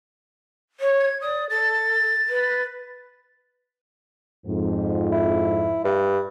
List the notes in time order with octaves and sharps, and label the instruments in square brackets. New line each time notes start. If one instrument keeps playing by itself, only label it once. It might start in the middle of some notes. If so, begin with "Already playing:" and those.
[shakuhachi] C#5
[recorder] G#6
[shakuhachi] D5 [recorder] D#6
[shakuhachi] A4 [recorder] A6
[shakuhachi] B4
[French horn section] F2 G#2
[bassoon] E4
G2